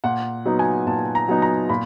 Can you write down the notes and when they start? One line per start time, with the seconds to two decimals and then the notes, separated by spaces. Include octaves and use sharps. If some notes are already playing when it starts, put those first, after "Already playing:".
0.04 A#2 F#5
0.45 F#3 B3 D#4
0.59 G#5
0.87 A#2 A5
1.15 A#5
1.28 F#3 B3 D#4
1.42 A#5
1.69 A#2 B5